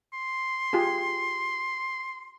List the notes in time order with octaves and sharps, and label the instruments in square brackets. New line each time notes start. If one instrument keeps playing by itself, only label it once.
[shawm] C6
[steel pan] F4 G4 G#4